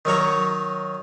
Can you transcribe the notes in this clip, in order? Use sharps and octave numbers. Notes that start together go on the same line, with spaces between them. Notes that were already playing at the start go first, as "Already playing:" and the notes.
D#3 F#3 C#5 A#5